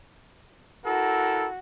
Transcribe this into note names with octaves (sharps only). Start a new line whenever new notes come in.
E4 F#4 A4 A#4